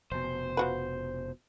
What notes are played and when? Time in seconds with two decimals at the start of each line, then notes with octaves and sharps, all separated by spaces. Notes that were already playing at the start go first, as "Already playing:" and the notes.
0.12 F1 B2 C5
0.57 F3 F#4 B4